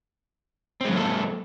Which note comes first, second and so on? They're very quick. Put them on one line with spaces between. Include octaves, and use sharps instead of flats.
C4 G#3 F#3 A#3 A4